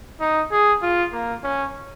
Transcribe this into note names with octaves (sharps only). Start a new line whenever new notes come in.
D#4
G#4
F4
A#3
C#4